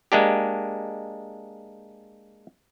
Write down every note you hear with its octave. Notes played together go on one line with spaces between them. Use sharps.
G#3 A#3 D4 G4